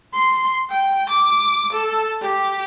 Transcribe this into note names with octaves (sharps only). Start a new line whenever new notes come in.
C6
G5
D6
A4
G4